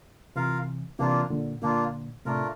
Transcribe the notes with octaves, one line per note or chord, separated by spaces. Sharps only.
C3 E3 F4 A#4 F5
C3 E3 A#3 D4 F4
A#2 D3
A#2 D3 A#3 D4 F4
A2 C3 A3 D4 F4 A#4